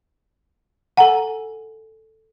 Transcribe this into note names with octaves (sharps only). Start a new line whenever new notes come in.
A4 F#5 G#5 A#5